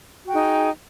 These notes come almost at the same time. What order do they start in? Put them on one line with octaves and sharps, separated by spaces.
F#4 G5 G#4 D#4